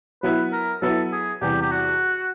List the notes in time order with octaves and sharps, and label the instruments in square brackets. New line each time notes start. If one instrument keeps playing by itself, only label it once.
[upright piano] F#3 B3 E4 [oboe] B4
[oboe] A#4
[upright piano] F#3 B3 E4 [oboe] A4
[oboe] G#4
[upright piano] E2 C3 E3 G3 [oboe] G4
[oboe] G4
F#4